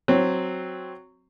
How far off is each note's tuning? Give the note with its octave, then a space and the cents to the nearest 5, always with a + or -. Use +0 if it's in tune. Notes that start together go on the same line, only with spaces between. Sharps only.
F#3 +0 C4 +0